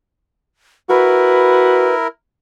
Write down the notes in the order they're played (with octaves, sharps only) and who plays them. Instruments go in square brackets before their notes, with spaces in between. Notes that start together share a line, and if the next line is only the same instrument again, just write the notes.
[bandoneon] E4 A#4 [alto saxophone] F#4 [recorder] B4